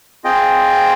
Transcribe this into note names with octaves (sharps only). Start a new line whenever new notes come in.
C4 F4 G#4 D#5 G5